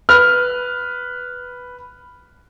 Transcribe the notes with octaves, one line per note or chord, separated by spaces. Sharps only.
B4 F6